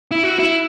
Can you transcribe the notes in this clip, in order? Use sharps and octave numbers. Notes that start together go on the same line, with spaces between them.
E4
F#4
E4